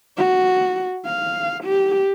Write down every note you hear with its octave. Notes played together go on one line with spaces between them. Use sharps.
F#4
F5
G4